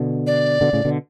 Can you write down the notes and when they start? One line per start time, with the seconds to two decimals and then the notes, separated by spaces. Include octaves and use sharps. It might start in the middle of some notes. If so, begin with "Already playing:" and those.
Already playing: B2 D3
0.27 D5
0.61 B2 D3
0.73 A2 C#3
0.85 B2 D3